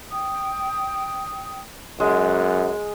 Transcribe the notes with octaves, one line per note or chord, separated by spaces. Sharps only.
G5 D#6
F#2 G#3 F#4